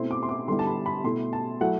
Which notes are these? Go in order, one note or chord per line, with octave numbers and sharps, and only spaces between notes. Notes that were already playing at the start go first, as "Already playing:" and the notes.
Already playing: B2 A3 C4 E4 C6
D6
C6
D6
D3 G3 B3 E4 C6
A5
B5
B5
B2 A3 E4 C6
A5
F#3 A3 E4 F#5